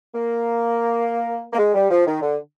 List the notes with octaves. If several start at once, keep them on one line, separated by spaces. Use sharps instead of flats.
A#3
A#3
G#3
G3
F3
D#3
D3